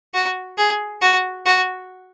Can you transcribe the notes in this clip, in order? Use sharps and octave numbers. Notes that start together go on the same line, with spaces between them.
F#4
G#4
F#4
F#4